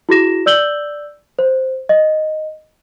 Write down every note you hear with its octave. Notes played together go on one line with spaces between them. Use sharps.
E4 F#4 G#4 A#6 E7
D5 E6 G6 F#7 G7
C5
D#5